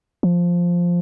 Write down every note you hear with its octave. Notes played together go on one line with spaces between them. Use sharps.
F3